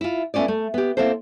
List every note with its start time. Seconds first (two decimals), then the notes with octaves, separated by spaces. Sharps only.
0.01 E4 F4
0.34 A3 B3 C#4 F4 D5
0.48 A3
0.74 B3 G4
0.97 A#3 C4 E4 A4 C5